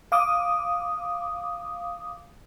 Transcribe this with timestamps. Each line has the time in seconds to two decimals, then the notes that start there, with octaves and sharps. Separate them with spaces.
0.12 F5 D6 D#6